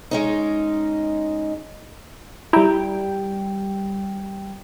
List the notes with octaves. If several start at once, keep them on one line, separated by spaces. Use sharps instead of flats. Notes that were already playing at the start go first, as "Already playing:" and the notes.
G#3 C#4 D#4
G3 E4 G5 A#5